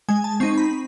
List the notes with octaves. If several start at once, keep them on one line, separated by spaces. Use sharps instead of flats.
G#3 G#5
A5
C4 D#4 C#6
B5